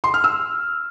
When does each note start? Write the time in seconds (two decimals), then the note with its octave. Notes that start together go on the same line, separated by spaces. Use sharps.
0.04 C6
0.14 F6
0.24 E6